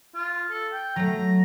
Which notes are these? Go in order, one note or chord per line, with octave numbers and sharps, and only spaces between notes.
F4
A4
G5
F#3 A3 A#5